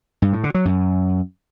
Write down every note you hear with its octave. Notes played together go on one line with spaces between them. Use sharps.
G2
A2
D3
F#3
F#2